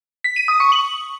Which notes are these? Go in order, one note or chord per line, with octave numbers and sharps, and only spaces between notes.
B6
D#7
D#6
C#6
F#7